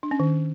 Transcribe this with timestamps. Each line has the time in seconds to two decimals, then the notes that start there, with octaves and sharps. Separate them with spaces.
0.03 D4
0.11 C#4
0.20 D#3